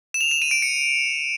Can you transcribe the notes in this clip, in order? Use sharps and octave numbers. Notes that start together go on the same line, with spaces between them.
E7
F7
E7
D#7
D7
C#7